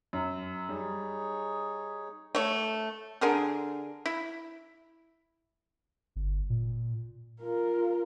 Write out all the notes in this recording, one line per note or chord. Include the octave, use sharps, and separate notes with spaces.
F#2
G3 D#4 G#4 C#5
A3 C#5
D3 G#4 A#4
E4
G1
A#2
F4 A#4